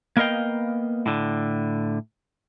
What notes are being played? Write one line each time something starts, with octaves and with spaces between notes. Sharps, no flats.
A#3 B3 A#4 D#5 F5 G5
A2 D3